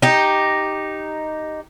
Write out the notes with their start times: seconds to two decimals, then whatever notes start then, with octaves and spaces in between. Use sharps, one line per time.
0.02 D#4 G4